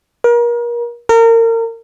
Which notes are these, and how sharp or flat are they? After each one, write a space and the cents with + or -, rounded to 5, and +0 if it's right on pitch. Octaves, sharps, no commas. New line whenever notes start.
A#4 +35
A#4 -30